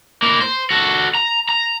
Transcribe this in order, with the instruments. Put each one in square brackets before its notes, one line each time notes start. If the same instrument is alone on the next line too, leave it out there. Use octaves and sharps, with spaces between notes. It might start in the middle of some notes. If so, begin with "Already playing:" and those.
[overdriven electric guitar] A#3 E4
C5
F#4 A4
A#5
A#5